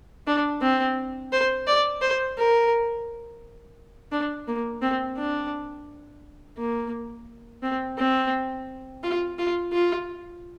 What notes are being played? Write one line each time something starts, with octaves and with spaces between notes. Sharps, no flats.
D4
C4
C5
D5
C5
A#4
D4
A#3
C4
D4
A#3
C4
C4
F4
F4
F4